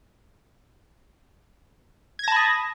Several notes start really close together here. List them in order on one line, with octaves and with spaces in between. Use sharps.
G#6 A#6 A5 B5 D#6